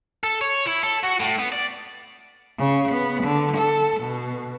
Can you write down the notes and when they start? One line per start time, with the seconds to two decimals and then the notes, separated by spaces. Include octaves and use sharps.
0.23 A4
0.41 C#5
0.67 E4
0.84 A4
1.04 F#4
1.20 A2
1.39 B3
1.52 D5
2.58 C#3
2.92 B3
3.23 D3
3.57 A4
4.01 B2